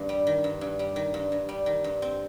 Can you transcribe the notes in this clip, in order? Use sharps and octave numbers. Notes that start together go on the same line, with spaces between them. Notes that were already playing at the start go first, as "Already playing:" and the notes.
Already playing: G2 D#3
G3
D#3
G2
G2
G3
D#3
G2
G2
G3
D#3
G2
C4